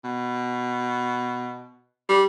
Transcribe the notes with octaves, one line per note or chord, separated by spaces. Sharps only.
B2
G3